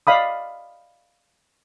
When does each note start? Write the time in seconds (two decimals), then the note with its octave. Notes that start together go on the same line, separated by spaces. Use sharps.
0.07 D5 D#5 F5 B5 D#6